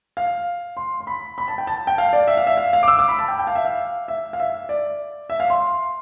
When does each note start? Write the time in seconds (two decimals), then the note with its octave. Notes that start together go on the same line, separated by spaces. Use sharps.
0.17 F5
0.77 C6
1.00 C6
1.07 B5
1.38 B5
1.48 A5
1.58 G5
1.67 A5
1.87 G5
1.98 F5
2.13 D5
2.27 E5
2.37 F5
2.47 E5
2.58 F5
2.73 F5
2.83 D6
2.88 E6
2.99 D6
3.08 B5
3.19 A5
3.28 G5
3.39 G5
3.47 F5
3.55 E5
3.65 F5
4.08 E5
4.33 F5
4.40 E5
4.69 D5
5.30 E5
5.40 F5
5.50 C6